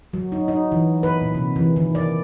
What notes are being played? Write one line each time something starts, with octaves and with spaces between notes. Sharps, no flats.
F#3
D#4
D#4
E3
B4
A#2
C3
E3
D#3
D5